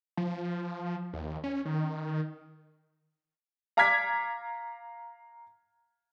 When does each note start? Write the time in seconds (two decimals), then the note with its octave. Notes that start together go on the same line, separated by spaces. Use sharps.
0.17 F3
1.13 D#2
1.44 C#4
1.65 D#3
3.77 F5 A#5 D6 F6 G#6 B6